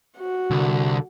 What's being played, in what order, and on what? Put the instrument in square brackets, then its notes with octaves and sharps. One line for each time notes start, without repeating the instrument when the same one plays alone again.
[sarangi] F#4
[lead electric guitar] C2 [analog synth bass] D3